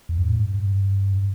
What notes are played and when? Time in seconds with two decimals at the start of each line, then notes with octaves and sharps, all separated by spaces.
0.09 E2
0.18 G2
0.27 A2
0.36 G2